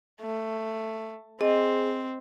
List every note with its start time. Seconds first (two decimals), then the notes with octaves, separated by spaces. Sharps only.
0.21 A3
1.41 C4 G#4 D#5